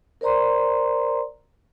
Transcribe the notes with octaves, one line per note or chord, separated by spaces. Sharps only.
A#4 C5 D5 A#5 C6